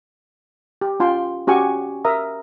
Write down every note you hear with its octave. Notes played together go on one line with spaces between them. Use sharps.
G4
C#4 F4 G5 C6
C#4 F#4 G4 G#5 C#6
A#4 E5 A#5 D#6